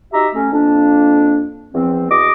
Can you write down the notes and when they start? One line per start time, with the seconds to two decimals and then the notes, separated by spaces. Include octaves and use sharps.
0.12 D#4 F#4 G4 E5 A#5
0.34 A3 C#4
0.51 F2 A#3 D4
1.73 E2 F3 C4
2.10 E2 F#4 D#5 D6